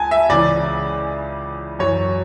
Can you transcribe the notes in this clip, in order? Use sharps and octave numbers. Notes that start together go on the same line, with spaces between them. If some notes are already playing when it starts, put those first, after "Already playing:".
Already playing: C#2 G#5 A5
E5
C#2 C#3 E3 D5
F#2 E3 C#5